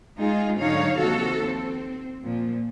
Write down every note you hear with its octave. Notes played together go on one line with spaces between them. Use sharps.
G#3 D#4 F4 G#4
G#2 D3 F#3 D#4 C#5 F5
D#2 C3 F3 F#4 A4
C4
A#2 F3